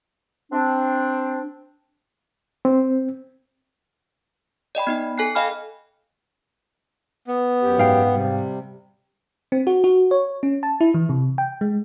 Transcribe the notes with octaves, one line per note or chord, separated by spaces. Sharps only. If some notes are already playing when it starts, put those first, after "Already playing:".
C4 D4
C4
D5 D#5 G5 B5
B3 D#4 G5
A4 G#5 F#6 C7
D#5 F5 G5 G#5 B5 F6
B3
F#2 G4
G#2 F5 G5
C3 G3
C4
F#4
F#4
C#5
C#4
A5
E4
E3
C3
G5
G#3